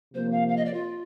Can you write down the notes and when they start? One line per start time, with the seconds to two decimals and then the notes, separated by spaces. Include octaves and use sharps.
0.14 C3 F3 A#3 C5
0.32 F5
0.49 F5
0.57 D#5
0.65 D5
0.74 F4